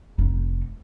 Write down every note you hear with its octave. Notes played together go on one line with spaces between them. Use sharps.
F1 D#4